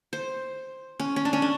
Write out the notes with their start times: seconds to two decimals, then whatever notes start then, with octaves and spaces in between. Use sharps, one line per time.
0.13 C5
1.00 C#4
1.16 C#4
1.25 D4
1.33 C#4
1.42 D4